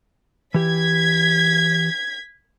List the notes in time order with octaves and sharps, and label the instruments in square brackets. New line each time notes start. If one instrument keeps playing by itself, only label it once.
[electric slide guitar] E3 G4 [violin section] G#6 B6